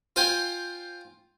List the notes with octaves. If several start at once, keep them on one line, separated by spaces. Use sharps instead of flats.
F4 C5 G5 G#5